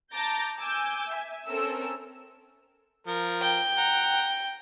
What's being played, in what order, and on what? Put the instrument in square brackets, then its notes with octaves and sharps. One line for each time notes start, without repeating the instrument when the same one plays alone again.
[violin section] A5 A#5 D6 G6 A6 A#6
G#5 D6 E6 G6
E5 G#5
C4 C#4 A4 A#4 E6
[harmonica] F3 A#4
[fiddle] G5
[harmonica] F#5 A#5